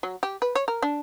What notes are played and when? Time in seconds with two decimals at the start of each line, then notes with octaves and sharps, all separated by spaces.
0.03 F#3
0.23 G4
0.42 B4
0.55 C#5
0.68 A#4
0.82 D4